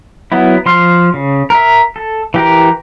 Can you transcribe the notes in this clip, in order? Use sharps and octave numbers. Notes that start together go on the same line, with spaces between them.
F#3 B3 E4
F3 C6 F6
C#3
A#4 E5
A4
E3 G4 A#4